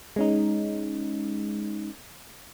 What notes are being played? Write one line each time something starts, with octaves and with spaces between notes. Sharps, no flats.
G#3 C#4 D#4